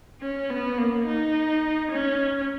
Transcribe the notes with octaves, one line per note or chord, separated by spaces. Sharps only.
C#4
B3
A#3
D#4
C#4